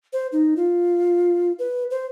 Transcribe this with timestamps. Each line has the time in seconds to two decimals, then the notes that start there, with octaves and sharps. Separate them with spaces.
0.13 C5
0.32 D#4
0.56 F4
1.59 B4
1.91 C5